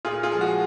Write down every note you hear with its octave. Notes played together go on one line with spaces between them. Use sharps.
A#2 F4 G#4
F4 G#4
F3 G#3
F#4